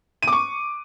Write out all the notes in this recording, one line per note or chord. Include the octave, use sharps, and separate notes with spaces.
D#7
D6
C#6